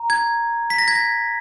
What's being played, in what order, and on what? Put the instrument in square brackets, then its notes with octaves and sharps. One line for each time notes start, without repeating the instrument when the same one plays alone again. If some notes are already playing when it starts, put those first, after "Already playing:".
Already playing: [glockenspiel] A#5
G#6
B6
A#6
G#6
A#6